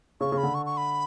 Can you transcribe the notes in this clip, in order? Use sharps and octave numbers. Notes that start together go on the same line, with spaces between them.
C#3 C#6
C#3
B5
D3
C#6
C#6
B5